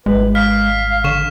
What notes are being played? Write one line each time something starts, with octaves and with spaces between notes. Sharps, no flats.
G#1 G#3 B4
F5 F6 B6
D3 C#6 E7